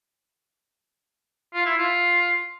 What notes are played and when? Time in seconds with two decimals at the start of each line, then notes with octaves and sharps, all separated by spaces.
1.53 F4
1.65 E4
1.77 F4